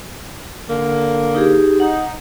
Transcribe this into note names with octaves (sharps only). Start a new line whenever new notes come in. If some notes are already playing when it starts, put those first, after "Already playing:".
D3 A#3
D#4 G4 G#4
D#4 F#5